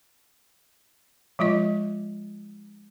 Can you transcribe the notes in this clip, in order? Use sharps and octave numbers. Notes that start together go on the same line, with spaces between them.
F3 G#3 F4 D#5